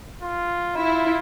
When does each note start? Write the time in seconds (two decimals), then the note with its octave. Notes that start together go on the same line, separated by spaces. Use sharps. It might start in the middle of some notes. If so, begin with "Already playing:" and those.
0.22 F4
0.77 E4 F4